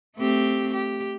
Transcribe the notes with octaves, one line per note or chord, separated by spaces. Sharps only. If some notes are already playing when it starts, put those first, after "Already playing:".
A3 C4 G4
G4